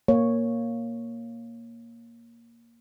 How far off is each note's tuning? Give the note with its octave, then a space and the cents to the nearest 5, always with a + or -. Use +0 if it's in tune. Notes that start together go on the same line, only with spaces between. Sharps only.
A#3 +0 C#5 +0